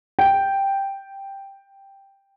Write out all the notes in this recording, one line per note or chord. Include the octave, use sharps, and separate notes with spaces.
G5